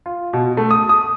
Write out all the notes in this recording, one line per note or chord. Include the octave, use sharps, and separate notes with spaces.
F4
B2
A3
D#6
D#6